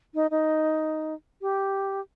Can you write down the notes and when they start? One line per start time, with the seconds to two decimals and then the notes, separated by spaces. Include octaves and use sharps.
0.14 D#4
0.31 D#4
1.42 G4